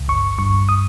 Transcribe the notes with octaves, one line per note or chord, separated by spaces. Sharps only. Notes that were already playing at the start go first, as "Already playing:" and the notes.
Already playing: C#2
G1 C#6
G2 C#6
D#6